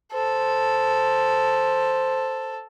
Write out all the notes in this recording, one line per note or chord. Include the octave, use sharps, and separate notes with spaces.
A4 C5